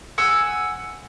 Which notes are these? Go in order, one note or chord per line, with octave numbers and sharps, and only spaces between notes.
F#5 G#5 E6